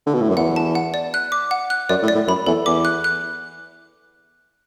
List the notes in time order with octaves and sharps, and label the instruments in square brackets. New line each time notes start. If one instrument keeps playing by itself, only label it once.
[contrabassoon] D3
B2
A2
F#2
[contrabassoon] E2 [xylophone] F#5
[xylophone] A5
F#5
D5
F#6
D6
F#5
F#6
[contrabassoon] F#2 [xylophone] D5
[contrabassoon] A2
[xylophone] D5
[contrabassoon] A2
[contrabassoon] F#2 [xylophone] B5
[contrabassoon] E2 [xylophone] A4
[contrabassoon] E2 [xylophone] D6
[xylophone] F#6
F#6